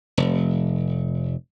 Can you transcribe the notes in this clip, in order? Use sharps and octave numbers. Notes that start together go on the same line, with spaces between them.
F1